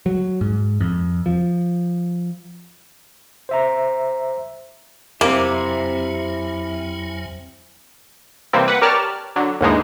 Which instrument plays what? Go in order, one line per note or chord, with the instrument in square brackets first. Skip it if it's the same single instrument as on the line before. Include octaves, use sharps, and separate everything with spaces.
[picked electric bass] F#3
G#2
F2
F3
[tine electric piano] C5 E5 A#5
[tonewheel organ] F2 F#3 G#5 [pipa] A#3 [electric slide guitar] C4 G4 [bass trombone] E4
[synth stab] C3 E3 G3 A#3 C4
B4 F#5
G4 A#4 C#5 D5 A5 F6
D3 F#3
D#2 G#2 D3 E3 G#3 D#4